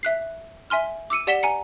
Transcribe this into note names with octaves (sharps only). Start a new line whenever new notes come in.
E5 F#6 C7
E5 G#5 C6 F6
D6 E6 C#7 D#7
G4 D5 F#5 B6 E7 G7
G#5 A#5 C#7